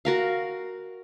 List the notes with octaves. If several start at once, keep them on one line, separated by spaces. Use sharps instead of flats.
F#4 A#4 F5